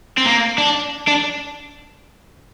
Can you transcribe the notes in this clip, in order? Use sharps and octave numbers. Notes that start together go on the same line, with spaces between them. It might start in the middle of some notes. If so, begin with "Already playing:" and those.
C4
A#3
D4
D4